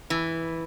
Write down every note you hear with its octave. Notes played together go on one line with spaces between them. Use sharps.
E3